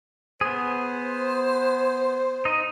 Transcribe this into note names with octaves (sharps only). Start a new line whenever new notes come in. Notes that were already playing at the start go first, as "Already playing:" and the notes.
B3 G#4 C5
D#4 D#5